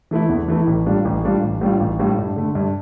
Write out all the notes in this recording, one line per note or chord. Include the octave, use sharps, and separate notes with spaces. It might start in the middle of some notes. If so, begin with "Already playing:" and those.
E3 A3 E4
E2
E3 A3 E4
A1
A2 G3 D4 F4
A1
A2 G3 D4 F4
A1
A2 G3 D4 F4
A1
A2 G3 D4 F4
G2
D3 A3
G2